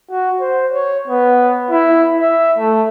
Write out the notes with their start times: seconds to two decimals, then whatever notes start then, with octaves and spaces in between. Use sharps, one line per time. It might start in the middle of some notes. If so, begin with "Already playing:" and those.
0.11 F#4
0.41 C5
0.73 C#5
1.08 B3
1.71 E4
2.20 E5
2.58 A3